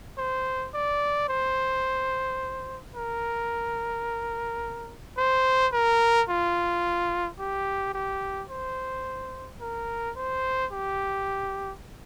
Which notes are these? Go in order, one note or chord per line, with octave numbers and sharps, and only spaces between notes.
C5
D5
C5
A#4
C5
A#4
F4
G4
G4
C5
A#4
C5
G4